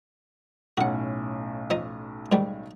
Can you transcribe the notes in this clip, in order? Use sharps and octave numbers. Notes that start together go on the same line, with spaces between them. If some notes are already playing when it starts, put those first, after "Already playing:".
B1 A2 C#4 F#4 F#5
F3 D#4 D#5
G#2 D#3 G3